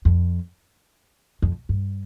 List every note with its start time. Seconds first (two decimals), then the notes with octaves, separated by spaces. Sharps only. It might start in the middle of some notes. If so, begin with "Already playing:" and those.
0.05 F2
1.42 F2
1.69 G2